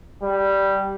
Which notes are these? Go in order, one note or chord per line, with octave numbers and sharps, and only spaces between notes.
G3